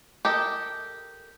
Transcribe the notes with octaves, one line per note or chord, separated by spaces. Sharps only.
G4 A4 A#4 D#5